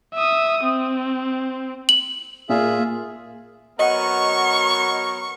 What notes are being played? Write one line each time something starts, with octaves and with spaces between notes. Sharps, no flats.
E5 D#6
C4
F#7
A#2 F4 G#4 E5
F#3 B3 A#4 D#5 F#5 C#6